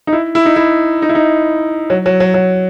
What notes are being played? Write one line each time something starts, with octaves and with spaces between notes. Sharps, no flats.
D#4
E4
E4
D#4
E4
D#4
E4
D#4
F#3
F#3
F#3
F#3